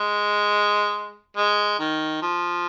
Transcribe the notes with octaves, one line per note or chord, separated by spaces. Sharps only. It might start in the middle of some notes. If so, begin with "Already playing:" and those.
Already playing: G#3
G#3
D#3
F3